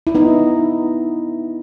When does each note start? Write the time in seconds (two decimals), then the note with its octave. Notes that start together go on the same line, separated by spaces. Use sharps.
0.07 E4
0.15 B3 D#4